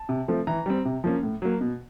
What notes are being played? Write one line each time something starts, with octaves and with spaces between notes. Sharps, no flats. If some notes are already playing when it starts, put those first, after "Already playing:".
Already playing: A5
C3
F3 A3 C4
E3 A#5
G3 C4
C3
F3 A#3 C#4
A2
F#3 A#3
B2